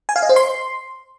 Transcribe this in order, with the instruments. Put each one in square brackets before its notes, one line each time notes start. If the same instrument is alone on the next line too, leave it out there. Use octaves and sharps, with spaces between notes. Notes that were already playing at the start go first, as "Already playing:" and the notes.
[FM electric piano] G#5
F5
D#5
C5
C6